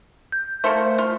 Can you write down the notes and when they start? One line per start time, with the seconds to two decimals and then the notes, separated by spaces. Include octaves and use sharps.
0.32 G6
0.64 A3 A#3 A4 C5
0.98 F4